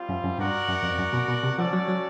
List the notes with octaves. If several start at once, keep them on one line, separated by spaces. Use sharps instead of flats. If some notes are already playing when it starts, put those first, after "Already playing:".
Already playing: G3 C4 F4
F#2
F#2
G2 F#4 A#4 D5 F#5
F#2
F2
F#2
B2
B2
C3
F3 C#4 F#4 A4 D5
F#3
F#3